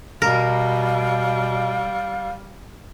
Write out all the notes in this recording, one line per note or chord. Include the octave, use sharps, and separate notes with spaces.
B2 G3 A#4 F5